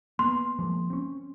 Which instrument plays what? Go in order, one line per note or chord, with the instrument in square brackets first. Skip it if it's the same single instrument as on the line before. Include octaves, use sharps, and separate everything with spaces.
[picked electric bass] A#3 B3 [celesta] C6
[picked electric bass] F3 G#3 A#3
C4 C#4